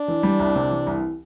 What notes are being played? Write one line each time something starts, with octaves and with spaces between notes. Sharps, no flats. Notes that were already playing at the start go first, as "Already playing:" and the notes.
Already playing: D4
E3
G3
C2
C3
E3
C2